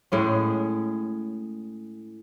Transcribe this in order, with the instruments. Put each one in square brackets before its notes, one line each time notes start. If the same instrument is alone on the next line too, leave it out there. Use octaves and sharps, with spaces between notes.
[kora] A2 G#3 C#4